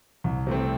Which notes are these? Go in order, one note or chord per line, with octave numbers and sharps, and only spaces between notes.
C2
C3 A3 C4